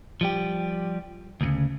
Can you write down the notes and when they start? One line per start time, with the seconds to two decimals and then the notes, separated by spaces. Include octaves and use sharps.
0.21 F3 G3 G4
1.41 D2 A2 C#3